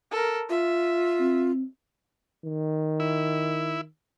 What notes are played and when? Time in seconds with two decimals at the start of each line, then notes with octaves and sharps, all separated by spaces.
0.12 A4 A#4
0.50 F4 E5
1.20 C4
2.45 D#3
3.00 E4